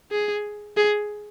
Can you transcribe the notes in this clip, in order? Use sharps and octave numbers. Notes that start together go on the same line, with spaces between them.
G#4
G#4